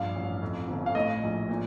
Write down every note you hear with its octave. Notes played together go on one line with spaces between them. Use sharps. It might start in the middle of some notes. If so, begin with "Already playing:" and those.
Already playing: A#1 G2 F5
A1
F2
G1
F5
A2 D#5
A#1
A#2